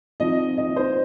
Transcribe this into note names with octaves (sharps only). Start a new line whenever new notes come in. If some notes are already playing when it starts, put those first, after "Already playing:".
F3 C4 D#4 D#5
D#5
C5